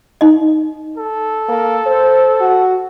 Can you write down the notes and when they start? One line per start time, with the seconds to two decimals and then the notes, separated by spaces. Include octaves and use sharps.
0.21 D#4 D#5
0.98 A4
1.49 A#3
1.86 C5
2.41 F#4